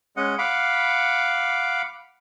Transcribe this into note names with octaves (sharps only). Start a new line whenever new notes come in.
G#3 C#4 D#5 F#5
F5 F#5 B5 D6